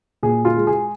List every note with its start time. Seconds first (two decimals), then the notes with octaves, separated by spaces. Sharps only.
0.23 A#2 G#4
0.45 F4
0.56 G#3
0.67 G#4